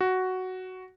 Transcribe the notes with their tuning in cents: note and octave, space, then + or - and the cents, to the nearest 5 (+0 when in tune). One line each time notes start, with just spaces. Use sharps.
F#4 +5